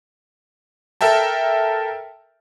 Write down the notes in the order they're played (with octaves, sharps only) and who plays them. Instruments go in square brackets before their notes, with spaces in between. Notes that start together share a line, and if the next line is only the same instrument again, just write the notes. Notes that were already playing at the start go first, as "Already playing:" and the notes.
[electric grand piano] A4 A#4 E5 G5 A5